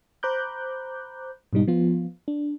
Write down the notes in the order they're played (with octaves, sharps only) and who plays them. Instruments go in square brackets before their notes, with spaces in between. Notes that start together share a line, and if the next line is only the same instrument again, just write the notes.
[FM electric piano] C5 A#5 B5 D6 F#6 G6
G#2 B2 G3 D#4
F3 B3 F4
D4